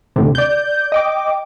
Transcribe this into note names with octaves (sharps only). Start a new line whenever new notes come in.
D2 A2 C3
D5 G6
D#5 G5 D6